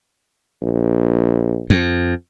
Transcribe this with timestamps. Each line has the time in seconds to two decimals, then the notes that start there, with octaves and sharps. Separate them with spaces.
0.62 A#1
1.70 F2